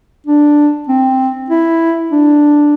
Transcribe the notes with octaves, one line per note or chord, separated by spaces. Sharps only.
D4
C4
E4
D4